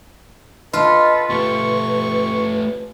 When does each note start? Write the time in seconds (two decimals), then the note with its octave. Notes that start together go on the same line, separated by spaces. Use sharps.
0.73 F4 A4 B4 D#5
1.30 A3 G4 B4 C#6